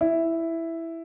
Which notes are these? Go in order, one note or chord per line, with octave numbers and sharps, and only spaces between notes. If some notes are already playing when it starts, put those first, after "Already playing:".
E4